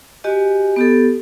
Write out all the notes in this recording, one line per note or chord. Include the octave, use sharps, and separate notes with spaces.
F#4 G4 D#5 G#5
B3 G4 A4